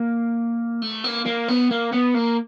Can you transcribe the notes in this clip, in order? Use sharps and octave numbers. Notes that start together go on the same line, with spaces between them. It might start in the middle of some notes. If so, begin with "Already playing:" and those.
Already playing: A#3
A3
A#3
A#3
B3
A#3
B3
A#3